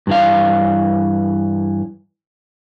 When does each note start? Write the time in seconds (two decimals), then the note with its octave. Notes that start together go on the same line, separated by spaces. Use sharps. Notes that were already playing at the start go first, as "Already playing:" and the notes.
0.07 G2 E3 F5